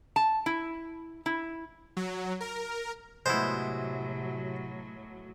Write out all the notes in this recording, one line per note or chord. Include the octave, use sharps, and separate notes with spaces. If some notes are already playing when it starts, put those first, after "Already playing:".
A5
E4
E4
F#3
A#4
A2 C3 F#3 G#3 B3 E4 C5